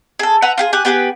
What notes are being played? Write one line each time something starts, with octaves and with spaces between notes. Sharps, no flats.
G#4 A4
B4 E5 F#5 A#5
F4 G4 G#4
G4 G#5 F#6
B3 G4 G#4 B4